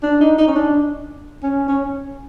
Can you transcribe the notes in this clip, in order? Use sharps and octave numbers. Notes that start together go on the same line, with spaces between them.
D4
D#4
D#4
C#4
D4
C#4
C#4